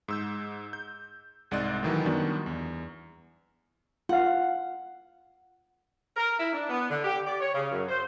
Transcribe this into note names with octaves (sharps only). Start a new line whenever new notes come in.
G#2 E6 G6
G6
C2 G#2 D5 D#5 F#6 A6
A2 D#3 E3 F#3
F#2 D#3 G3 B3 D4 F#4
E2
F4 F5 F#5
A#4
E4
D4
B3
D3
G4
D5
C#5
C#3
F#2
C5